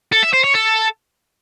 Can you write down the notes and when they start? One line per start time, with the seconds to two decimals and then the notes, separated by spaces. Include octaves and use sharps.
0.13 A4
0.23 E5
0.34 C5
0.44 C#5
0.55 A4